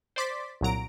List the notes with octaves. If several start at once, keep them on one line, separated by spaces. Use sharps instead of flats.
C5 D5 C6 D6 A6 B6
C2 A#2 F#3 A#5 D7